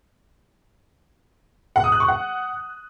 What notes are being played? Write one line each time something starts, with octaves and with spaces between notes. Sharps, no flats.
F#5
D#6
F#6
C#6
F#5